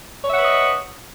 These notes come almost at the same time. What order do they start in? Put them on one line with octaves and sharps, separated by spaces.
C#5 E5 F#5 B4 D#5